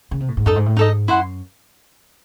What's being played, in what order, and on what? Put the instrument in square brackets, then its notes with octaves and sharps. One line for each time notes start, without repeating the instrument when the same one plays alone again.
[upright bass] C#3
C3
A2
G#2
[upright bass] F#2 [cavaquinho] D#4 A4 D#5
[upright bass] G#2
A2
[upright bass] G#2 [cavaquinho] D#4 A4 D#5
[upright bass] F#2 [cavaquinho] E4 C5 F#5 C6